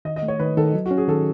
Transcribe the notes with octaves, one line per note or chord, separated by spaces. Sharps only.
D#3 D#5
D#5
A3
C#5
D#3 B4
D#3 A4
F#3
F#4
C#4
G#4
D#3 A4